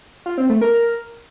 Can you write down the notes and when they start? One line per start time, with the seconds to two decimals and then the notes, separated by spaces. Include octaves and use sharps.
0.26 F4
0.38 C4
0.50 A3
0.61 A#4